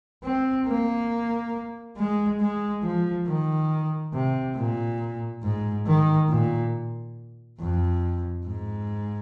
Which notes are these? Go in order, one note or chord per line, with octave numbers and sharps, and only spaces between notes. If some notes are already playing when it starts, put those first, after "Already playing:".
C4
A#3
G#3
G#3
F3
D#3
C3
A#2
G#2
D#3
A#2
F2
G#2